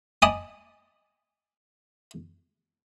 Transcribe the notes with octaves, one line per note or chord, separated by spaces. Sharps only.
D#5 G#5 A5 B5 D6 D#6